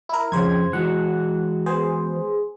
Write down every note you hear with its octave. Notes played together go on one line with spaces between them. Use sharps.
E4 A#4
F2 C#3 C5 G#6
E3 G#3 F#4 F#5
B3 G#4 C5